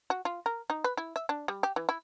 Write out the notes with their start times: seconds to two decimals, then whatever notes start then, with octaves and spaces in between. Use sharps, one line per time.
0.10 F#4
0.25 F4
0.46 A#4
0.70 D#4
0.84 B4
0.97 E4
1.16 E5
1.29 D4
1.48 G3
1.63 G4
1.76 E3
1.89 E4